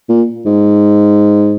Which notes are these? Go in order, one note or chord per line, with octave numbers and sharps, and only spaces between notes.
A#2
G#2